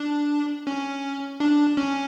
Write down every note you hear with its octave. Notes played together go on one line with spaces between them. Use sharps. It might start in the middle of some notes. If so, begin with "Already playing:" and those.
Already playing: D4
C#4
D4
C#4